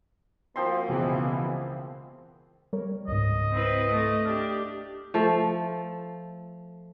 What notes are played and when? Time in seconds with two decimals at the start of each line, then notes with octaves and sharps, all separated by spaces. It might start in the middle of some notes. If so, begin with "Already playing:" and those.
0.56 F3 A#3 C4 F#4 A#4 C6
0.87 C#2 B2 E3 B3 G#4
2.73 G3 A#4 C#5
3.08 C#2 G#2 D#5
3.52 C4 E4 B4
3.91 A3
4.25 D4 G4 F6
5.14 F3 A3